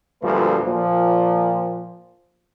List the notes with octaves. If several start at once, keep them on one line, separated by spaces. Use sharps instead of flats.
D2 A#2 F3 G3 A3 B4
A#2 F3